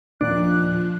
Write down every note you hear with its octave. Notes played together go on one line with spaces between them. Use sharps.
D#2 A#2 F3 D4 F#6